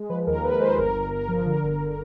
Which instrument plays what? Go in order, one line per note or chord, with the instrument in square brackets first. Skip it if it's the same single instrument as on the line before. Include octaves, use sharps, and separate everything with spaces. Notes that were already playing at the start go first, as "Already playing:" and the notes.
Already playing: [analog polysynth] G#3
F3 B4
D#2 A#4
D#2 B4
G#3 C5
G1 A#4
G1
G1 A#4
F3
D3 A#4
G1
D3